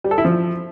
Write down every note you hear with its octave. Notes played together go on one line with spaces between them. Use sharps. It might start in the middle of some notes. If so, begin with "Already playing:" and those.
G3
A4
E4
F3